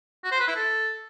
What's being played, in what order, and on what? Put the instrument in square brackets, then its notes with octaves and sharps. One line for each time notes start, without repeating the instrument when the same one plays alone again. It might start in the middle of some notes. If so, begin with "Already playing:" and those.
[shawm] F#4
C5
B4
E4
A4